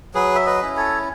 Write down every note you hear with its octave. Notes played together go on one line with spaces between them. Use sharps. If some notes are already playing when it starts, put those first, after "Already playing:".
F#3 G#4 B4
E5
B4 D#5
C#4 E4
A4 C#5